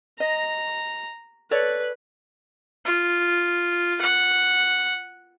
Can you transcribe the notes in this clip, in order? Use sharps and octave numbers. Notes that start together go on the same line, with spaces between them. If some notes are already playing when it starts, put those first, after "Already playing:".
D#5 A#5
A4 B4 C#5 D5
F4
F#5